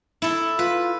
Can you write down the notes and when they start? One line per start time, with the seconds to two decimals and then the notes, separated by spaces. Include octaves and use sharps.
0.22 E4 A4
0.59 F4 B4